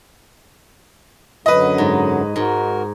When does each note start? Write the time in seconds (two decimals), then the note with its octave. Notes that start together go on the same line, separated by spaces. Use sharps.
1.46 F#2 D3 F#3 B4 D#5
1.78 G#2
2.36 G#2 F#4 A#4